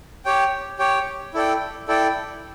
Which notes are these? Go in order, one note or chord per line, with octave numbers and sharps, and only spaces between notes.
G4 C#5 G5
G4 C#5 G5
E4 A4 D5 G5
E4 A4 D5 G5